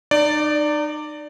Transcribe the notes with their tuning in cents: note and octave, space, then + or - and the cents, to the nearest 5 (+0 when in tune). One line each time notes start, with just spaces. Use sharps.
D#4 -35 D5 +0